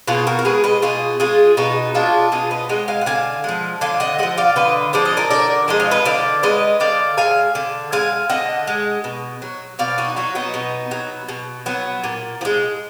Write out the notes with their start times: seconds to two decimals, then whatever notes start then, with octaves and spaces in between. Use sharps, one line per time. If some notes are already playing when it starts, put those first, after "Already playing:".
0.08 B2 F4 G#4
0.27 F#4 A#4
0.39 A#4
0.45 G#3 G#4 B4
0.64 B4 D#5
0.82 B2 F4 G#4
1.20 G#3 F4 G#4
1.57 B2 D#4 F#4
1.94 G#3 D4 F4
2.32 B2 F4 G#4
2.51 B4 D#5
2.69 G#3 D#5 F#5
2.88 F5 G#5
3.01 F#5
3.06 D3 F5 G#5
3.44 F3 G#3
3.81 D3 F5 G#5
4.00 D#5 F#5
4.18 F3 G#3 D#5 F#5
4.38 D5 F5
4.56 D3 B4 D#5
4.93 F3 G#3 D5
5.05 D#5
5.17 A#4 D5
5.30 D3 A#4 D5
5.68 F3 G#3 D#5
5.80 F5
5.91 B4 D#5
6.05 D3 D5 F5
6.43 G#3 B4 D#5
6.80 D3 D5 F5
7.17 G#3 F5 G#5
7.55 D3
7.92 G#3 F5 G#5
8.29 D3 D#5 F#5
8.67 G#3
9.04 B2
9.42 F#3
9.79 B2 D5 F5
9.98 D#4 F#4
10.16 F#3 D#4 F#4
10.35 B3 D#4
10.54 B2
10.91 F#3
11.29 B2
11.66 F#3 B3
12.04 A#2
12.41 F3
12.45 G#3